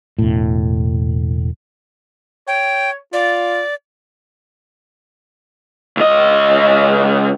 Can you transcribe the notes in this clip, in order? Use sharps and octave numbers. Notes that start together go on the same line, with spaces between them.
E1 A2
C#5 G5
F4 D5
C#2 D#5